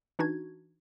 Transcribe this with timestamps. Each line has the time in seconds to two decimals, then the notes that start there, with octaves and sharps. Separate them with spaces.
0.19 E3 D4 D#4 F#4 G#6